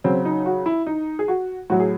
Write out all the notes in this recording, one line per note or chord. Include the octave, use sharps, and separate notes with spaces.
C#3 F#3 C4
D#4
F#4
E4
D#4
G#4
F#4
A2 F#3 F#4
G#4